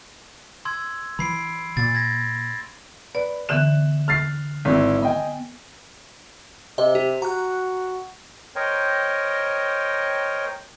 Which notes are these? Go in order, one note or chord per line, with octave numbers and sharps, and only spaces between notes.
C6 E6 G#6
E3 B5 C7 D7
A#2 A6
G#6 A#6
B4 D5
D3 E3 B3 F#6 E7
F6 A6 C7
G#1 E4
B3 D#5 G5 G#5
C3 D#5
G4
F#4 A#5 F#6
A#4 C5 C#5 D#5 G5